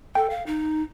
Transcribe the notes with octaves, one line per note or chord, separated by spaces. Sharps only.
A4 G5
F5
D#4